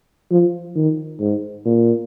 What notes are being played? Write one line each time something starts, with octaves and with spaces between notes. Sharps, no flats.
F3
D#3
G#2
A#2